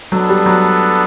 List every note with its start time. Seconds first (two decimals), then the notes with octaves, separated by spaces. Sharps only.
0.12 F#3 B3 D4 A4
0.29 G3
0.46 F#3